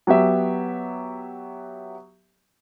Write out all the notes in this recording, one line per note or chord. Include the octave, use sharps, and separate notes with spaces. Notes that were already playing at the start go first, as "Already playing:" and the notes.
F#3 B3 G4 E5